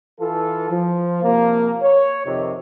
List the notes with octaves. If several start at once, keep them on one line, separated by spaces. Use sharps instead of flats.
E3 F4 A4
F3
C3 F3 A#3
C#5
F2 C3 D#3